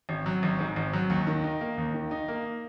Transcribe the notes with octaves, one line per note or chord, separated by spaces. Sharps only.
G#1
F#3
G#1
G#2
G#1
F#3
D#2
D#3
D#4
A#3
D#2
D#3
D#4
A#3